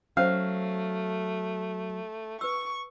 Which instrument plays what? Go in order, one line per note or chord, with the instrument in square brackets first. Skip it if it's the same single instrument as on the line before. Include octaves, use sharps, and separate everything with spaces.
[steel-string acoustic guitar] F#3 [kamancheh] A3 [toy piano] C#4 C5 [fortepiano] F5
[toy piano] B4 E6 [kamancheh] C#6